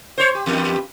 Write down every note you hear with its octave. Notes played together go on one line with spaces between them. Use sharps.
C5 C#5
G4
E2 G2